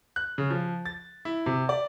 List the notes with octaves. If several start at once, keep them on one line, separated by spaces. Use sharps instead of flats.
F#6
C#3
F3
A6
E4
C3
D5